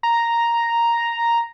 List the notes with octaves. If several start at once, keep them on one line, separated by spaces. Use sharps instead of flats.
A#5